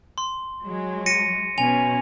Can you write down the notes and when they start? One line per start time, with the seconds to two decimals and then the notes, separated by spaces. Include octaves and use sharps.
0.18 C6
0.64 F#3 G#3
1.06 A#6 C#7 D#7
1.58 B2 C#4 G#5 F7